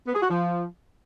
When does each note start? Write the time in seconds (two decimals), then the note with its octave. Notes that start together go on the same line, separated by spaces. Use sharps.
0.07 B3
0.15 G#4
0.22 F#4
0.30 F3